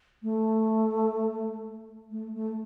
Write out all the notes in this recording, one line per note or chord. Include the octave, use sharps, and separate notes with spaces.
A3
A3
A3